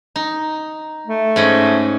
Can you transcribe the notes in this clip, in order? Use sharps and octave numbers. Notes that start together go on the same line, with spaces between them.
D#4
A3
G#2 C#4 D#5